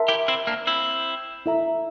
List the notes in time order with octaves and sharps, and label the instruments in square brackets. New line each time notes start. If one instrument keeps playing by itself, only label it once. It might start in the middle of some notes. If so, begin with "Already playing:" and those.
Already playing: [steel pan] A#4 E5 A5 C6
[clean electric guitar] E4 G4
C4 E4
A#3 D4
C4 E4
[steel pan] E4 A4 E5 A#5